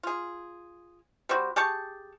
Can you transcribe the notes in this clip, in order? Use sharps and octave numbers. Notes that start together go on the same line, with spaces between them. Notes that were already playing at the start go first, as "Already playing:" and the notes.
F4 G#4
G3 C4 F#4
G4 G#4 A5 C#6